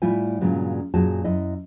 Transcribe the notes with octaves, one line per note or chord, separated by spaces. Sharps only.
A2 G3 E4 F4 G#5
G2 A#2 C#3 F#3 G#3
F#2 A#2 F#4 G#4 A5
F#2 E4 D#5